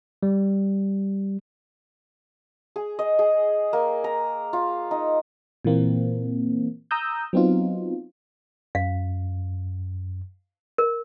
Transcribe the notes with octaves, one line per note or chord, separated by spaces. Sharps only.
G3
G#4
D#5
G#4
A#3
A#5
F4
D#4
A#2 E3 A#3 C4
A#5 D#6 E6 G6
F#3 B3 C4 D#4 F4
F#2 F5
A#4